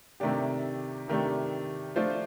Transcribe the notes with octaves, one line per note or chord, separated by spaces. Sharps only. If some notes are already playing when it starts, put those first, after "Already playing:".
C3 D#3 A3 D4 G4
C3 D#3 A3 D4 G4
F3 A3 D4 F4 C5